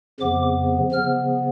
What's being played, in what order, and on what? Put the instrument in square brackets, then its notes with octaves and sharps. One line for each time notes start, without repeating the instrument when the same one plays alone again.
[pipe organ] F2 C#3 F3 B3 D6
C#3 F3 B3 F6